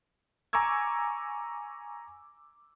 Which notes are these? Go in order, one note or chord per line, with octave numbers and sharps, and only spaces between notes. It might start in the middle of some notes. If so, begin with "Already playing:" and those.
G#5 A#5 C#6 D6 E6 G#6